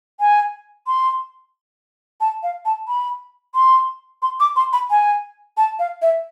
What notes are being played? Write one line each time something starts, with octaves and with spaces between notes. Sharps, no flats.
G#5
C6
A5
F5
A5
B5
C6
C6
D6
C6
B5
G#5
A5
F5
E5